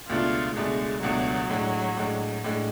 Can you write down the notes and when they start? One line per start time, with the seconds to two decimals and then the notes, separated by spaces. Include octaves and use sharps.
0.09 C#2 B2 A3 D4 F4
0.56 C#2 B2 G#3 A3 D4
1.03 C#2 B2 F#3 A3 D4
1.50 A2 G#3 D4
1.97 A2 G#3 D4
2.44 A2 G#3 D4